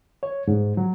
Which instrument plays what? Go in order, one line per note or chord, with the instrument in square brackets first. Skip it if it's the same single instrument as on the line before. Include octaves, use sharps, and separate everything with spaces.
[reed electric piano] C#5
G#2
F#3